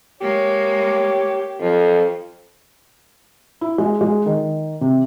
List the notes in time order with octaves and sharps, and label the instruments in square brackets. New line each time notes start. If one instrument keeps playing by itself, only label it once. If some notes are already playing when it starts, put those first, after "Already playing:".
[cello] G#3 A#3 [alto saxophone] G4 [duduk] C#5
[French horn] F2 [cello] F3
[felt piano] E4
G#3
G#3
D#3
C3